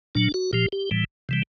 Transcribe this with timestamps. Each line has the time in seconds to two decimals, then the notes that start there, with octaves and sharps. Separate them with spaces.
0.15 A#2 F#3 D4
0.34 F#4
0.53 A#2 F3 G4
0.72 G4
0.91 A2 E3 G3
1.29 C3 E3 G3